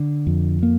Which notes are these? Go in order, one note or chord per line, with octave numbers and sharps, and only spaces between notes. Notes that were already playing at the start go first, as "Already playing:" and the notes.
Already playing: D3
F2
A#3